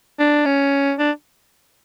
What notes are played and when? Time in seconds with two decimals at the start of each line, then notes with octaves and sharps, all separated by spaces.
0.19 D4
0.45 C#4
0.99 D4